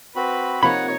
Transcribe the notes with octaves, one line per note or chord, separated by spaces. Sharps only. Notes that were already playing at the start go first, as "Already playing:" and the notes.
C4 F#4 B4 B5
C3 F3 A#3 D#4 C#5 F#5 B5